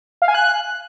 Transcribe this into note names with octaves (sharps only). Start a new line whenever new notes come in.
F5
G#5
F#6